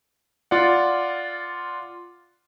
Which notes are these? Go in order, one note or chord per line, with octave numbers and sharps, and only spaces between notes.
F4 D5 F#5